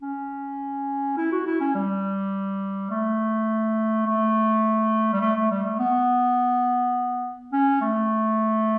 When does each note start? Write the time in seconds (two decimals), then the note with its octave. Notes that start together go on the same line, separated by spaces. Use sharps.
0.01 C#4
1.17 E4
1.32 F#4
1.46 E4
1.60 C#4
1.75 G3
2.91 A3
4.06 A3
5.13 G3
5.22 A3
5.36 A3
5.51 G3
5.65 A3
5.79 B3
7.52 C#4
7.81 A3